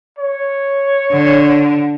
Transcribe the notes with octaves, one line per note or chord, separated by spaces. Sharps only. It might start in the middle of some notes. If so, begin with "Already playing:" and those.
C#5
D3